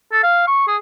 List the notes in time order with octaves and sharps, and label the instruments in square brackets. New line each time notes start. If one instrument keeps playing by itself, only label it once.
[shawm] A4
F5
C#6
G#4